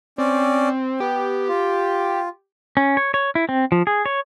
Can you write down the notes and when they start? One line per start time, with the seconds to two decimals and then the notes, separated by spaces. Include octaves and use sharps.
0.18 C4 C#4 D5
1.00 B3 G4
1.48 F4
2.77 C#4
2.97 C#5
3.14 C#5
3.35 E4
3.49 C4
3.72 F3
3.87 G#4
4.06 C#5